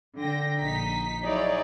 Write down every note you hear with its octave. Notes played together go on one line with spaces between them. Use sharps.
D3 G5 A#6
A#1 D#4 B6
F#3 D#4 E4 G#4 C#5 D5